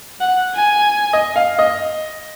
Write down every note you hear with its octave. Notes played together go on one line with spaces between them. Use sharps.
F#5
G#5
D#5
F5
D#5